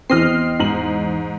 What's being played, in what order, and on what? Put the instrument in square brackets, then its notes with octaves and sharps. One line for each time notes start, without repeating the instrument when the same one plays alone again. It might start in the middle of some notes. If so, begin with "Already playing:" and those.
[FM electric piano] E2 D#5 C7 [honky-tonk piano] C4 F6
[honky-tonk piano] G#2 F#7